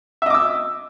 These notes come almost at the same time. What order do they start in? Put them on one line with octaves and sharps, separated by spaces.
E5 D#5 D6 E6